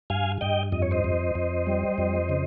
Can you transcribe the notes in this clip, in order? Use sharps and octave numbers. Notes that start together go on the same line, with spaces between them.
G2 F5 G#5
G2 D#5 G5
F2 D#5
C#5
C5 D#5
F2
F2
G3
F2
C#3